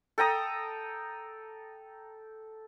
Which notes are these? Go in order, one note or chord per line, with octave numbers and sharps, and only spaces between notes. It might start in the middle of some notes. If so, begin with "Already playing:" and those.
A4 G5 A#5 D#6